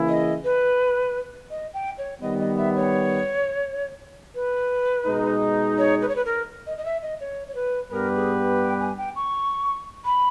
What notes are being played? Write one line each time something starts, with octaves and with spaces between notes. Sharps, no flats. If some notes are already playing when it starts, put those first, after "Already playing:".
Already playing: C#3 E3 A#3 E4 G#4
D#5
B4
D#5
G5
C#5
D#3 G3 B3 D#5
D#5
E5
C#5
B4
B2 G#3 D#4
C#5
B4
C#5
B4
A#4
D#5
D#5
E5
D#5
C#5
C#5
B4
G2 G3 B3 G4 A#4 B4
G#4
G5
G#5
G5
C#6
B5